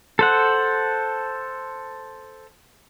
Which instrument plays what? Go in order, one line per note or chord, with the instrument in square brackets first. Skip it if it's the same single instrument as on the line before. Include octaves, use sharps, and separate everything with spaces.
[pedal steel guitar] A4 C5 F#5